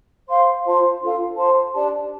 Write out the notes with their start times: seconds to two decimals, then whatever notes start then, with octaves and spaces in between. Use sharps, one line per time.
0.27 C5 F5 C6
0.64 F4 C5 A5 C6
1.00 D4 F4 A4 F5
1.37 C5 A5 C6
1.74 D4 G4 D5 A5